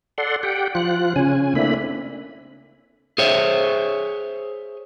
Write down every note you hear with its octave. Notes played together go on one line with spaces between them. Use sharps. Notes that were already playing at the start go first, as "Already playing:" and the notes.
A4 D5 F#5 C6
G4 F#5 G5
F3 F4 F#6
C#3 C#4 G#5
A3 A#3 C4 D4 E4 B5
G#4 C5 C#5 E5